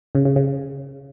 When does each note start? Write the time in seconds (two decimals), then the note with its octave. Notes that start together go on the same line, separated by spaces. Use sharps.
0.15 C#3
0.25 C#3
0.36 C#3